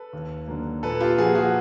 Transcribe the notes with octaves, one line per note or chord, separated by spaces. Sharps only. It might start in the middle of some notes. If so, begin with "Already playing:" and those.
Already playing: A4 B4
D#2
D3 F#3 A#3
A#2 A4 B4
F4 G4
F3 A#3 F#4 G#4
F#4 G#4